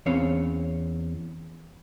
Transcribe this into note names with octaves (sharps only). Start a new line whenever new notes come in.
E2 C4 C#4 C#5 F5